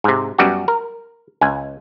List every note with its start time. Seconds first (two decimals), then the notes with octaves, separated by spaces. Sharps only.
0.04 G#2 C3
0.38 F#2 G3 B3 F#4
0.68 A#4
1.41 C#2 G#5